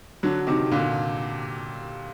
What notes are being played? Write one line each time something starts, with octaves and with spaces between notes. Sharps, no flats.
D3 F#3
C3 D#3
A#2 D3